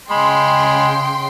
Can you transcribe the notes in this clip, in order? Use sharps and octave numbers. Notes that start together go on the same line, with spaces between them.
C#3 G#3 G5 B5 C6